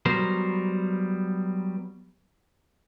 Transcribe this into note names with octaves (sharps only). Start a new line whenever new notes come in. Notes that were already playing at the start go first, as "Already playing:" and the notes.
F#3 G3 B3 A#4 C5